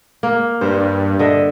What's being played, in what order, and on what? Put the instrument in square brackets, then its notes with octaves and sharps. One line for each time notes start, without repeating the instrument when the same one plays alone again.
[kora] A#3
[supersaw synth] G2 [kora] C5
[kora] D3 D#5 E5